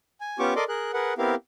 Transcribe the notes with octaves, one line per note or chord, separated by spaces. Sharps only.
G#5
B3 C#4 F4 G4 C#6 D6
A4 A#4 D5 D#5 C6 D6
G#4 A#4 F#6
G#4 A#4 B4 F#5
B3 C4 E4 G4 A#4 F5